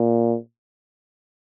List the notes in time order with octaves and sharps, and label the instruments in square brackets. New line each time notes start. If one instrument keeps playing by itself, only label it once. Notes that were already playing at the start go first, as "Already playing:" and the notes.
Already playing: [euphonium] A#2